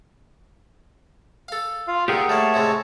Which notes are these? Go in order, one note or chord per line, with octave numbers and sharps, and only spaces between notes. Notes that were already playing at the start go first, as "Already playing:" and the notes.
A4 F5
F4 F5
A#2 D3 G4 G#4 A#4 F#5 G5
G3 A3 A#3 C#5 A5
A2 C3 G#3